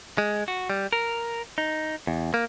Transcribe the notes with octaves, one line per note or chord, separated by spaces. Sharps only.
G#3
F#4
G3
A#4
D#4
E2
A#3